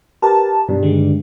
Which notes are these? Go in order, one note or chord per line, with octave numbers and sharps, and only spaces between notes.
G4 A#4 B4 A5
G2 B2
D3 D#3 G#3